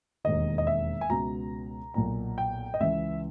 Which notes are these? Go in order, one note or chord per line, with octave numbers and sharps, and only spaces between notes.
E1 D#2 D#3 D#5
D#5
E5
G#5
C#2 B2 A#5
B1 A#2 A#5
G5
D#5
C#2 C#3 E3 E5